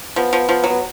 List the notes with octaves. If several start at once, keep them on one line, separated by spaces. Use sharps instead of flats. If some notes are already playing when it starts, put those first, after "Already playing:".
F3 B3
F3
F3
F#3
B3